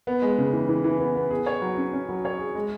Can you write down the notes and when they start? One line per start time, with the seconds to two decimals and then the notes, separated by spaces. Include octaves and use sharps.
0.07 B3
0.22 G#3
0.38 C#3
0.53 E3
0.69 E3
0.84 E3
1.00 B3
1.15 B3
1.31 G#4
1.46 C#5
1.62 F#3
1.77 C#4
1.93 C#4
2.09 F#3
2.25 C#5
2.39 G#4
2.55 G#3